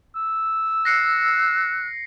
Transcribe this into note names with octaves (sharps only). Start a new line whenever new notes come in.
E6
F#6 A#6 C7 C#7